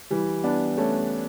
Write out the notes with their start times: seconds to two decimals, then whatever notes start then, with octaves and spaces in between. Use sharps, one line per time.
0.10 E3 G3
0.44 B3 D4
0.77 A3 C#4